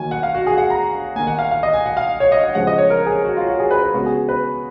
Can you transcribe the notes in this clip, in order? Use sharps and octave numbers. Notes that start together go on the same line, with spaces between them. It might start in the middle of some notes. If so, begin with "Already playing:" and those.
Already playing: D#3 F#3 A#3 G#5
F#5
F5
F#4
G#4
F#5
A#5
D#3 A#3 G#5
F#5
F5
F5
D#5
G#5
F#5
F5
C#5
D#5
F#5
C#3 F3 G#3 F#5
D#5
C#5
A#4
G#4
F#4
F4
F#4
G#4
B4
B4
C#3 G#3 B3 F#4
G#4
B4